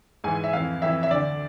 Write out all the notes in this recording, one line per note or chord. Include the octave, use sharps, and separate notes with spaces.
G#2 E3 G#5
E5
F2 E3 F5
F2 E3 E5
E5
D2 D3 D5